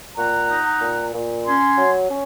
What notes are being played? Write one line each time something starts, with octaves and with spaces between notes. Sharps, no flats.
A#2 F#5 A#5
D#4
A#2
A#2
C#4 G#5 C6
F#3
C#4